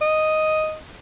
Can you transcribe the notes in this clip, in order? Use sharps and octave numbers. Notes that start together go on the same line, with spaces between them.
D#5